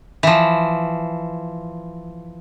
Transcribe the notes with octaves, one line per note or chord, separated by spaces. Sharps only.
E3 F3